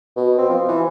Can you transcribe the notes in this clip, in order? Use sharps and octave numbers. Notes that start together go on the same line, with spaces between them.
B2
C4
F3
E3